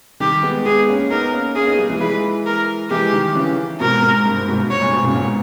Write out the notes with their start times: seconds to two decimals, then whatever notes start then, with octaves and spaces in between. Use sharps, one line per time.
0.20 D#3 G3 G4
0.43 G#3 B3
0.65 G#3 B3 G#4
0.89 A#3 C#4
1.10 B3 D#4 A#4
1.33 A#3 C#4
1.55 A#3 C#4 G#4
1.67 B3 D#4
1.78 G3 A#3
1.90 E3 G#3
2.01 E3 G#3 B4
2.46 A#4
2.90 E3 G#3 G4
3.13 D#3 G3
3.35 C#3 E3
3.80 G#2 B2 A#4
4.03 G#2
4.25 G2
4.37 G#2
4.48 G#2 B2
4.60 G2
4.70 G#2 C#5
4.82 G2 A#2
4.93 G#2 B2
5.04 A#2 C#3
5.16 G#2 B2